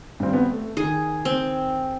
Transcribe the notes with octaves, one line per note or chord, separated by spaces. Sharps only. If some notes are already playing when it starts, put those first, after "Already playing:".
G2 C4
B3 C4
A3
D#3 G#4
C4